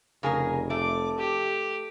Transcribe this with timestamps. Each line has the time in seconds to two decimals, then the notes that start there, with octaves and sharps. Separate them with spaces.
0.23 F1 C#3 G#4 A#4
0.70 A3 D6
1.19 G4